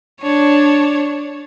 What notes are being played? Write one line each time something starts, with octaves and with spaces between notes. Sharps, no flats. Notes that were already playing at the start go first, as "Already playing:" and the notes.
D4 C#5